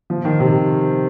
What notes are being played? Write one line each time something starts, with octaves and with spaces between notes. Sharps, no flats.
F3
D#3
C3